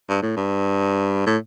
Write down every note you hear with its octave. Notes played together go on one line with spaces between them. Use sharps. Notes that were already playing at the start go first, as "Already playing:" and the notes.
G2
A2
G2
A2